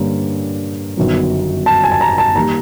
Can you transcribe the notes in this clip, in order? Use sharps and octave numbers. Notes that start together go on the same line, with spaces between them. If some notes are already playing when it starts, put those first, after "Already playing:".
Already playing: G2 D3 G3 A#3 C#4
G1 F#2 D#3 F#3 B3
A5
G#5
A5
A#5
A5
D#3 G3 A#3 A#5